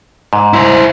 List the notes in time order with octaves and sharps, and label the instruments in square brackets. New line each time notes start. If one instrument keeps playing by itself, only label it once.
[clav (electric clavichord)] G#2
[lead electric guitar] E4 C5